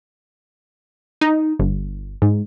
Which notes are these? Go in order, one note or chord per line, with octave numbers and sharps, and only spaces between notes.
D#4
G1
G#2